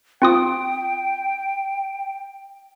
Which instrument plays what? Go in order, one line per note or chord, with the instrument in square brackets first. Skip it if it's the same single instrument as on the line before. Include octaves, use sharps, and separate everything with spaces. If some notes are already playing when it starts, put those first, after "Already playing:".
[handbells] C4 F4 D#6 [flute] G5